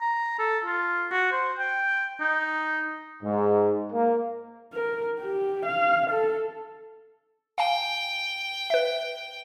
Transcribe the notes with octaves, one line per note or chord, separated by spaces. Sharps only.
A#5
A4
F4
F#4
C5
G5
D#4
G#2
A#3
A#4
G4
F5
A4
F5 G5 G#5
B4 E5